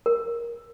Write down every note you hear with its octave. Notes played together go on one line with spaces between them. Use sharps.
A#4